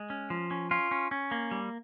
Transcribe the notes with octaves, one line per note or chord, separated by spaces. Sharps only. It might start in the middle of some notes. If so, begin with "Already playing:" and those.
Already playing: G#3
C#4
F3
C#4
C#4 F4
C#4
C#4
A#3
G3